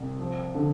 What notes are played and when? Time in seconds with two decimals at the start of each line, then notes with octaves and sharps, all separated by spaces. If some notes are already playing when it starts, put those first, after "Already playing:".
Already playing: C2 C3
0.19 F3
0.55 D3